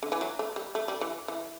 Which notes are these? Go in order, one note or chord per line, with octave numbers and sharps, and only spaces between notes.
D3
E3
F#3
A3
G3
A3
G3
E3
E3